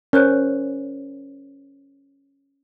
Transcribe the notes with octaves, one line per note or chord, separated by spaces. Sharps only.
C#4 A#4 C5 F#6